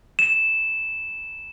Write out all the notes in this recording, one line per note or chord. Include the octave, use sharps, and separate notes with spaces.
E7